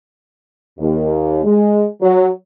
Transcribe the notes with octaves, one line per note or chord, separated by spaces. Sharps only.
D#2
G#3
F#3